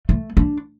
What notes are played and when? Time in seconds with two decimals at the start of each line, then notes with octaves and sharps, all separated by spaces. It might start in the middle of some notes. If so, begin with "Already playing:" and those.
0.09 A3
0.37 D4